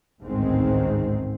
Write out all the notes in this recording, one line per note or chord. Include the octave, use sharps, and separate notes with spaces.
A1 D2 G#2 D#3 G#3 C4